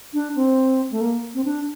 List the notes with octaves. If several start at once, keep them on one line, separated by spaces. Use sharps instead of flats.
D4
C4
A3
A#3
C4
D4